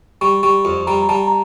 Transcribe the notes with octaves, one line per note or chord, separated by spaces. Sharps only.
G3 C#6
G3 C#6
F2
G3 A#5
A#5
G3 A5
A#5